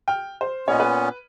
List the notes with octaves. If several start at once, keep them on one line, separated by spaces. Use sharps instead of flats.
G5 F6
C5
A#2 B3 C#4 C#5 D#5
B4